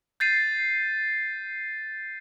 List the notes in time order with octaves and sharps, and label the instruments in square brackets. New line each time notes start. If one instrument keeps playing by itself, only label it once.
[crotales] G6 A6 C7 D#7